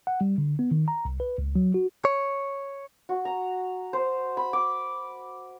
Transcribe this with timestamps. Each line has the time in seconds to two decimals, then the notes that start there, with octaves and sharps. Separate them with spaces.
0.07 F#5
0.21 G3
0.38 D3
0.59 B3
0.71 D#3
0.88 A#5
1.05 C2
1.20 B4
1.38 C#2
1.56 F#3
1.74 F#4
2.05 C#5
3.09 F#4
3.25 A#5
3.93 C5
4.37 B5
4.53 D6